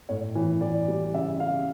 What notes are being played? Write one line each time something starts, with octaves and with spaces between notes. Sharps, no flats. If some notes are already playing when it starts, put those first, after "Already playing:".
A2 C#5
E3
E3 D5
G3
C#3 E5
C#3 F5